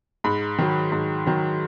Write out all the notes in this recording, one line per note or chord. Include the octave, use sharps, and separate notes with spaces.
G#2 B5
D#3 F#3
G#2
D#3 F#3